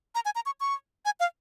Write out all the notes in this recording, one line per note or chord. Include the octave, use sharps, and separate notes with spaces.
A#5
G#5
A#5
C#6
C#6
G#5
F5